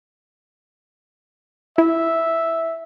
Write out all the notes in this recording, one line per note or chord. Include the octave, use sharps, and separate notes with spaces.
E4 E5